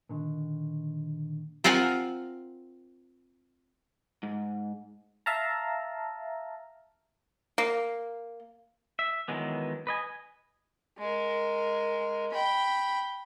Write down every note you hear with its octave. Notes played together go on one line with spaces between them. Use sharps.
A#2 D3 D#3
C4 F4 A#4 F#5 G#5
G#2
E5 F5 A5 A#5
A#3
E5
D#3 E3 F#3 G#3 B3
B4 D#5 G#5
G#3 A#4
G5 B5